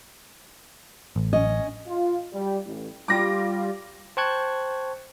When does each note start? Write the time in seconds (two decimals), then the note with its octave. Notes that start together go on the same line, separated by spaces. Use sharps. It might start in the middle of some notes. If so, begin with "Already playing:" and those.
1.16 A1
1.33 C#4 D#5
1.87 F4
2.33 G3
2.65 A1
3.08 G3 F4 D6 A#6
4.17 C5 G5 A5 C#6 F#6 G#6